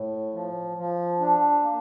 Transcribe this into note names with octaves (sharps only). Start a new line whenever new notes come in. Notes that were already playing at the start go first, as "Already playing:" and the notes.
Already playing: A2
F3
F3
D4
A#3